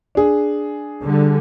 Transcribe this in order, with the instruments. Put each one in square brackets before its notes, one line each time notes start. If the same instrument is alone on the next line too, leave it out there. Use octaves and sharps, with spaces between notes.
[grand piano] D4 G#4
[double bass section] D3 G3